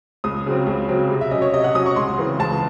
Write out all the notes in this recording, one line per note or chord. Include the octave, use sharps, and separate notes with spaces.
C#2 D#6
C#3 F#3 C4
C#2
C#3 F#3 C4
C3
E5
F#3 C#4 D#5
C#5
C3 D#5
F#5
F#3 C#4 D#6
C#6
C#2 C6
C#3 E3 C4
C#2 A5